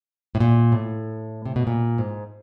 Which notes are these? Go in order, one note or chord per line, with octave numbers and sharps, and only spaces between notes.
A2
A#2
A2
C3
B2
A#2
G#2